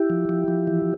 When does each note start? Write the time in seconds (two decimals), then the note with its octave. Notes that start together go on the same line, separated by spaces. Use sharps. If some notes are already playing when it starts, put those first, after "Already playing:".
Already playing: E4 G4
0.10 F3
0.29 F3
0.48 F3
0.67 E3